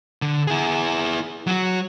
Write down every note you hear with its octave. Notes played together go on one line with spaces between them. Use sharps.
D3
E4 G#4
F#3 F#4